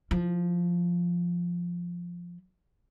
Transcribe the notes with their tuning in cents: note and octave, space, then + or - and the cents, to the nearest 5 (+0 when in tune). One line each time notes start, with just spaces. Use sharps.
F3 +0 E4 +25